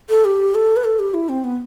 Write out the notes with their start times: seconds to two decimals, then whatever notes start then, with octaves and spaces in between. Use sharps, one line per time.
0.09 A4
0.25 G4
0.55 A4
0.77 B4
0.84 A4
0.99 G4
1.14 E4
1.29 C4
1.44 B3